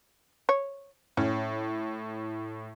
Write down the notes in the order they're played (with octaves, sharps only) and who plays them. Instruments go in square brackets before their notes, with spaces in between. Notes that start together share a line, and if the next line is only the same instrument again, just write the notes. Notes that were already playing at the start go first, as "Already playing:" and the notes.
[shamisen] C#5
[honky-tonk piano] A2 [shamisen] C#4